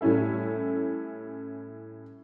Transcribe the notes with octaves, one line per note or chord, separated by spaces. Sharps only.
A2 G3 C#4 E4 A4